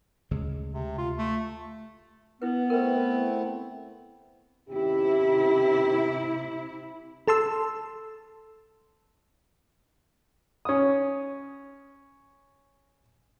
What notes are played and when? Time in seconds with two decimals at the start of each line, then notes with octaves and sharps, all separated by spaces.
0.31 D2 C#3 G#3
0.73 C3
0.98 F4
1.18 A3
2.42 B3 E4 B4
2.70 A3 C4 E4 A#4 B4
4.69 D#2 C3 C#4 E4 G4
7.28 A4 A5 C6 E6
10.65 C#4 D#6